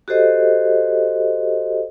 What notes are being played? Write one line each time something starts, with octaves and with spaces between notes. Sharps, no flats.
F#4 G4 A4 C5 D#5